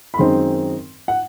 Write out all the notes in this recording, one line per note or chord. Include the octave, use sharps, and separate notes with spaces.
B5
F#2 D#3 G#3 C4 D#4 C6
F#5